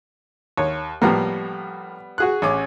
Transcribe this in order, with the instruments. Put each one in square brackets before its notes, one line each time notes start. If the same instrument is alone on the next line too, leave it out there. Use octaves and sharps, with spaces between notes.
[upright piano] D#2 [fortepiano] C#5
[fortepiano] A2 F3 A#3 [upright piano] G3 B3
[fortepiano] F#4 G#4 F#6
[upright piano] A1 C#4 D6